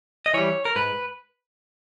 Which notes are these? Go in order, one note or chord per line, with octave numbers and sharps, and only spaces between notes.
D#5
E3 G3 C#5
A#4
G#2 B4